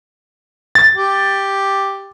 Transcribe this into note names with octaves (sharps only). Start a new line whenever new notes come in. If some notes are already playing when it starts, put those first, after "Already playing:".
A6
G4